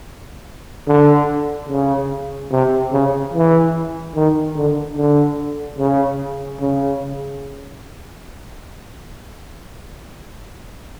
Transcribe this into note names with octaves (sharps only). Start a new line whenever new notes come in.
D3
C#3
C3
C#3
E3
D#3
D3
D3
C#3
C#3